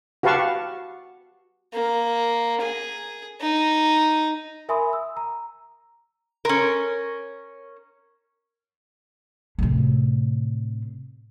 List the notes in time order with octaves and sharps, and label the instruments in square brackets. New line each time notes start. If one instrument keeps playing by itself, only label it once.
[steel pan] F#4 G4 B4 F5 A5 C#6
[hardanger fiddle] A#3
G#4
D#4
[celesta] A#4 E5 G#5 B5 C6 D#6
E6
A#5
[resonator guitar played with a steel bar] C#4 A#4
[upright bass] A2 C3